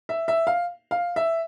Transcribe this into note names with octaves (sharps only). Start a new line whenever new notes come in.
E5
E5
F5
F5
E5